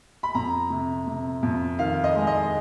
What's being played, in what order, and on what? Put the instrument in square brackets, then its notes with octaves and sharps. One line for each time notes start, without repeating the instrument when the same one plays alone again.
[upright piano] B5
F2 A#5
C3
C3
F2
D#3 F5
D#5
G#3
D#5